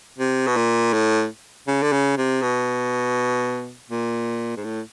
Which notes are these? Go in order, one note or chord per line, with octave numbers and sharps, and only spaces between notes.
C3
B2
A#2
A2
C#3
D3
C#3
C3
B2
A#2
G#2
A2